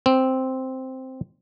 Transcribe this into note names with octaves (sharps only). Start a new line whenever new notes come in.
C4